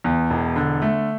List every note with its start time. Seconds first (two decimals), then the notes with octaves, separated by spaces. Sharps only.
0.04 E2
0.30 E1
0.56 D3
0.82 A3